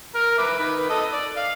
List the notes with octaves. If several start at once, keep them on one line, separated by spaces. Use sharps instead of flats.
A#4 F6
B4 E5 D6
D#3 B4
A4 D#5 D#6
D5
F5